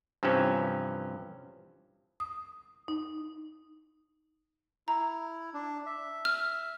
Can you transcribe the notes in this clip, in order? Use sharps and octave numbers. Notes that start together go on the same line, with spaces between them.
G2 C3 E3 F3 C#4
D#6
D#4
E4 A#5
D4
E5
F6